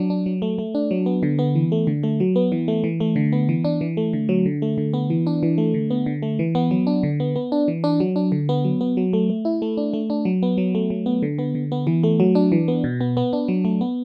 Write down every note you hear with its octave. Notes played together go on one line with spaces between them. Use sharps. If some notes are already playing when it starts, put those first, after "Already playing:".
Already playing: F#3 D4
D4
F#3
A3
A3
D4
F#3
B3
D3
B3
E3
A3
D3
A3
F#3
B3
E3
A3
E3
A3
D3
B3
E3
D4
E3
A3
D3
F#3
D3
A3
D3
B3
E3
D4
E3
A3
D3
B3
D3
A3
E3
B3
F#3
D4
D3
B3
B3
D4
E3
D4
F#3
D4
D3
B3
F#3
B3
F#3
A3
A3
E4
A3
D4
A3
D4
F#3
B3
F#3
A3
F#3
B3
D3
B3
D3
B3
E3
A3
F#3
D4
E3
B3
B2
B3
B3
D4
F#3
A3
B3